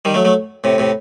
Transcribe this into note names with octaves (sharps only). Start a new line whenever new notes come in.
D#3 G3
F#3 A3
F#3 A3
A2 C3
A2 C3